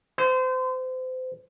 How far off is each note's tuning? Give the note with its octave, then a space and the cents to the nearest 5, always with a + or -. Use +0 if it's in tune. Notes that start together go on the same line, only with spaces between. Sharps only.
C5 -30